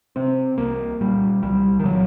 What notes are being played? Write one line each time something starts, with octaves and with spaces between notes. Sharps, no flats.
C3 C4
C2 A#3
A#2 G3
C2 G3
D#3
A#2 F#3